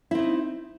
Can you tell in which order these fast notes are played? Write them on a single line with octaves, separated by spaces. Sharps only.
E4 C4 D#4